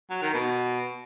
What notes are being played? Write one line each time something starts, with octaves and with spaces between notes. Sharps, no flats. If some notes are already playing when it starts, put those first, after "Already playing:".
F#3
D#3
B2